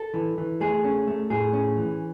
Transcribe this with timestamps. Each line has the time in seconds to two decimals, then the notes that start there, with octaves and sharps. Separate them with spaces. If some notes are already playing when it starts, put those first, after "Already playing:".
Already playing: A4
0.14 E3
0.38 E3
0.60 A3 G#4
0.84 C#4
1.07 A3
1.30 A2 G#4
1.53 C#4
1.77 E3